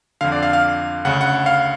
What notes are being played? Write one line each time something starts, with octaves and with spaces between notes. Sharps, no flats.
F2 D3 F5
D5
F5
F5
D2 C#3 F#5
F#5
F5